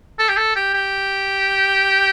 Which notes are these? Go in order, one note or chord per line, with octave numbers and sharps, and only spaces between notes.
A4
G4
A4
G4
G4